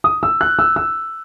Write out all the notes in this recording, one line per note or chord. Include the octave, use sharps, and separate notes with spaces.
D#6
E6
F#6
E6
E6